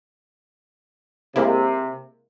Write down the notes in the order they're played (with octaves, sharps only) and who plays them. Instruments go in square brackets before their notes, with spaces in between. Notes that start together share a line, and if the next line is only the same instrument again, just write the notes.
[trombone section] C3 [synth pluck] G#3 A#3 E4